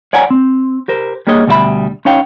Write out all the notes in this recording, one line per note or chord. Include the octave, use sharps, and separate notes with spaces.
C#5 D5 F#5 G#5 A#5
C4
G4 A#4 C5
G3 A#3 D4 G#4 C#5 D#5
D2 B2 G3 F#4 E5 B5
C#4 D#4 C#5 F5 G5